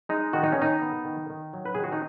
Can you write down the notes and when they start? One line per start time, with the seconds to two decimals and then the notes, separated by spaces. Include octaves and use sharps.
0.09 G#3 D#4
0.33 D#3 F#4
0.43 D#4
0.52 C#4
0.57 D#3 D#4
0.81 B3
1.05 D#3
1.30 D#3
1.53 F#3
1.66 B4
1.75 D#3 G#4
1.84 F#4
1.92 D#4